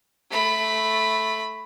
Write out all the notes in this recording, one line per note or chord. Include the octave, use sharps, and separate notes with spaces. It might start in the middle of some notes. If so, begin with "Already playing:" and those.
A3 B5